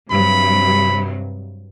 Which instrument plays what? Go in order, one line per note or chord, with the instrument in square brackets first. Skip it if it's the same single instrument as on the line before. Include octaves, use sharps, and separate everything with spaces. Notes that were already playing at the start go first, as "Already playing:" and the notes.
[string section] G2 C3 F#3 [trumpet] B5